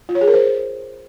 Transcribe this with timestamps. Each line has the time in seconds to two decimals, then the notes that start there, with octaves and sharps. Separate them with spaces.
0.09 F4
0.15 C#5
0.21 G#4
0.27 A#4
0.34 C5